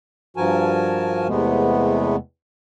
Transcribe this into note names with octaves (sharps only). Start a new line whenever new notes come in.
G2 F3 F#4 A#4 G#5 A5
E2 C3 G#3 A3 B3